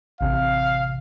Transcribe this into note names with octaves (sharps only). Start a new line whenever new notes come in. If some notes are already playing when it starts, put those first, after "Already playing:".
A1 C3 F5